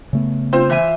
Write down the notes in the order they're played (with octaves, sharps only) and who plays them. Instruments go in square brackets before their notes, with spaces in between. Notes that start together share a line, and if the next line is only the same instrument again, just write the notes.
[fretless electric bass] C#3 A3 B3
[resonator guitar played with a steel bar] C4 [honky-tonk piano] F4 C5
[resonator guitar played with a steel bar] E3 E5 G#5